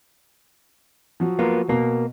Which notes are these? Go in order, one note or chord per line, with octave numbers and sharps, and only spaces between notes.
F3 F#3
A#3 B3 F4
B2 A#3